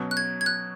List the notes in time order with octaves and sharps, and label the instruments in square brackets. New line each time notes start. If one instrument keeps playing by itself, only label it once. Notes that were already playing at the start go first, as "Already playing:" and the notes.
Already playing: [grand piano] B2 F#3 C#4
[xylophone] F#6
G#6
G#6
F#6